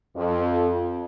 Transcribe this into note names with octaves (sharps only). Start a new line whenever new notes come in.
F2